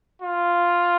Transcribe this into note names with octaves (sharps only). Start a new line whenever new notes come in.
F4